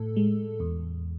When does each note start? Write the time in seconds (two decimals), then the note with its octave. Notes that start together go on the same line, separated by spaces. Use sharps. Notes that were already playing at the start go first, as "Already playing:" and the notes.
Already playing: A2 A4
0.16 G#3
0.60 E2